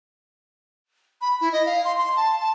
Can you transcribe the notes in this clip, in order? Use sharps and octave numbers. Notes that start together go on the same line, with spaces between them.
B5
E4
D#5
F5
C6
C6
A5
A5